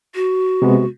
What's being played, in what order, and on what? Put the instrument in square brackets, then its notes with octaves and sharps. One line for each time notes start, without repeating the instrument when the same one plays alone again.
[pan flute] F#4
[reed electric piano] C3 G#3 B3